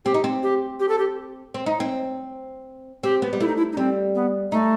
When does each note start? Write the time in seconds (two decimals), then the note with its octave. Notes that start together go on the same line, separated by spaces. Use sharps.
0.05 C4 G4
0.14 D#4
0.24 C4
0.43 G4
0.80 G4
0.89 A4
0.99 G4
1.54 C4
1.66 D#4
1.80 C4
3.04 C4 G4
3.22 B3
3.33 G3
3.41 A3 E4
3.48 D#4
3.56 E4
3.72 D#4
3.77 G3 C4
4.15 B3
4.52 A3 D#4